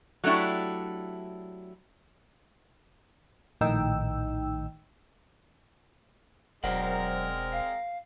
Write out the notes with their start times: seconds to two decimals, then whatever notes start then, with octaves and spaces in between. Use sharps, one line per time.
0.24 F#3 A3 D4 E4 G4
3.61 A#1 A2 D#3 D#4 G5 E6
6.64 E1 F#3 G#3 C4 A#4 C5 D5 F#5
7.52 F5